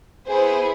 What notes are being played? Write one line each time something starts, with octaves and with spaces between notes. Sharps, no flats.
B3 E4 G#4 C5